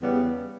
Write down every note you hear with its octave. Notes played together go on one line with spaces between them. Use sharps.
E2 C#3 G3 B3